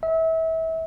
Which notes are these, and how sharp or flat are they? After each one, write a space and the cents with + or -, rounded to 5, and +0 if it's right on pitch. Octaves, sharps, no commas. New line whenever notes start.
E5 -30